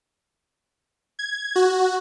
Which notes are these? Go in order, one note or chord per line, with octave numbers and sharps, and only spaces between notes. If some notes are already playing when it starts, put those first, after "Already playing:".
G#6
F#4